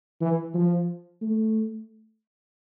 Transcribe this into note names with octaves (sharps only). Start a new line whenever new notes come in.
E3
F3
A3